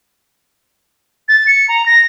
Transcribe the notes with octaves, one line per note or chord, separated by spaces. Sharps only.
A6
C#7
A#5
A#6